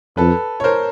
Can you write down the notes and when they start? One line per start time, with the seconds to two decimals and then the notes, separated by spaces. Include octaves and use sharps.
0.17 F2 A4 B4
0.60 C#5
0.64 A#4 C5